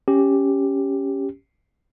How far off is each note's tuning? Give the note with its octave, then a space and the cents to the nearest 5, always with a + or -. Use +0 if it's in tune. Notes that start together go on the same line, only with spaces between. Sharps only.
C#4 +0 G4 +0